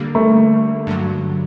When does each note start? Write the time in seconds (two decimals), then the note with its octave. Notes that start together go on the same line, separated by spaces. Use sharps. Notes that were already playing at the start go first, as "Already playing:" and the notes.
Already playing: D3 G3 A#3
0.15 A3
0.87 G2 D3 F#3